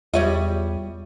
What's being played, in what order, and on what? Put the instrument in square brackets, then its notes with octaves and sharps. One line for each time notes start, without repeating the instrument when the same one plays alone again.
[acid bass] E2 [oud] G3 C#5 D#5 [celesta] F4 E5